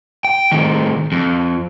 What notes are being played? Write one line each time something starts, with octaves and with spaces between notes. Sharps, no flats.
G5
A2 D#3
F2